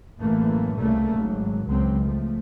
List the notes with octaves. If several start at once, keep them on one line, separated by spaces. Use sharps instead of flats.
A1 F#2 E3 A3 A#3
C2 C#3 G3 A3 A#3
G#1 F#3
C#2 F#3 C4
F3 A3